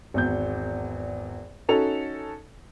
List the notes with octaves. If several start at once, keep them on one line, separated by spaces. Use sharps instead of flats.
G#1 E2 G6
C#4 D#4 F#4 A4 F7